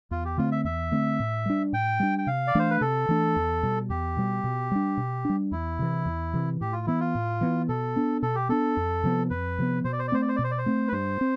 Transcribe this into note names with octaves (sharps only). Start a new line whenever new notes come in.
E2 F4
G4
D3 A3 C4 F4
E5
E2 E5
D3 A3 C4
A2
G3 D4
A2 G5
G3 D4
G5
C3 F5
D5
E3 A3 D4 C5
B4
C3 A4
E3 A3 D4
E2
B2 G3
E2 G4
B2 G3
B2
G3 D4
B2
G3 D4
E2 E4
C3 E3
E2
C3 E3
A2 G4
F4
E3 B3 E4
F4
A2
E3 B3
B2 A4
B3 D4
B2 A4
G4
B3 D4 A4
F2
C3 F3 B3
F2 B4
C3 F3 B3
B2 C5
D5
C5
D5
A3 C4 C5
D5
C5
D5
B2
C5
D5
C5
A3 C4
B4
G2 C5
C4